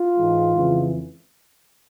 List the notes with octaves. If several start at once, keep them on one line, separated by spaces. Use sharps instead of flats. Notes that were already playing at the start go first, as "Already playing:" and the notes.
Already playing: F4
G#2 E3 G#3
F2 C#3 E3 G#3